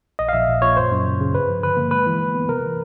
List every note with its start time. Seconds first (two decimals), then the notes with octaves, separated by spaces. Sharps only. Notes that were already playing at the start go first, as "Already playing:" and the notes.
0.19 A#1 D#5
0.29 F5
0.33 A#1 E5
0.48 A#2
0.62 A#2 C#5
0.77 F#2 C5
0.91 F#2
1.06 C#3
1.20 C#3
1.35 G2 B4
1.48 F3
1.63 D3 B4
1.77 A#3
1.91 G#3 B4
2.06 E3
2.21 E3
2.34 B3
2.49 C3 A#4
2.64 E3